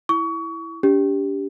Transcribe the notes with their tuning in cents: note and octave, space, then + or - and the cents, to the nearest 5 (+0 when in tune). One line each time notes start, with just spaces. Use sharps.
E4 +0 C#6 +30
D4 -40 G4 +0